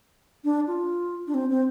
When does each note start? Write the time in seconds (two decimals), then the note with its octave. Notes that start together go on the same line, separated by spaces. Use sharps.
0.44 D4
0.67 F4
1.27 D4
1.34 C4
1.50 C4